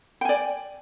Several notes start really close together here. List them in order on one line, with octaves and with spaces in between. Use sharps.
G5 G#5 D5